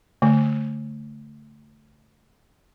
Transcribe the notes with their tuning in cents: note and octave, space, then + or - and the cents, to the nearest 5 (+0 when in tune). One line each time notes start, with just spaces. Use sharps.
D3 -35 A3 +0